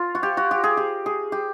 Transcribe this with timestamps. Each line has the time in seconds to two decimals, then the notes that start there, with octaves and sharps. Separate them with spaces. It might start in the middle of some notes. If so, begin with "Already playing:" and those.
Already playing: F4
0.15 F#4
0.23 G4
0.37 F#4
0.51 G4
0.64 G#4
0.77 G4
1.06 G#4
1.32 G4